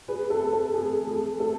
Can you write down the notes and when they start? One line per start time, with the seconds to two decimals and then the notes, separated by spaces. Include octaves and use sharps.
0.08 G#4 B4
0.30 A4
0.53 A4
0.74 G#4
1.07 G#4
1.40 A4